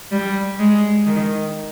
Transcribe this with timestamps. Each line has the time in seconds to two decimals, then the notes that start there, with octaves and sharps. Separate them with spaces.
0.12 G3
0.59 G#3
1.06 D#3